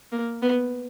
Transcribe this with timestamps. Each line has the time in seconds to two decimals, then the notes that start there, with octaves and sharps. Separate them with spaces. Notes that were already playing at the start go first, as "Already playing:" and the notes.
0.12 A#3
0.42 B3